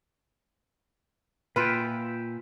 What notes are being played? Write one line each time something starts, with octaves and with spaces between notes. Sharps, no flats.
A#2 F4 B4 E5 G5